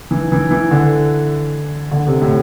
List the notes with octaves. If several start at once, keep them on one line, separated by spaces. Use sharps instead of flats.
E3
E3
E3
D3
D3
C3
A2